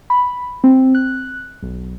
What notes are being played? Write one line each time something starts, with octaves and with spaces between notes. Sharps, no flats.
B5
C4
F#6
B1